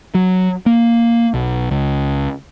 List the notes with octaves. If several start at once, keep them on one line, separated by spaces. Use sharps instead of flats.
F#3
A#3
B1
C#2